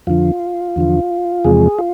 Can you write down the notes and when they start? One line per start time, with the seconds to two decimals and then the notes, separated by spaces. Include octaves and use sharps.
0.07 F2 D3 F3 F4
0.76 E2 D3 F3
1.44 E2 C3 F3 G#3 G#4
1.79 F4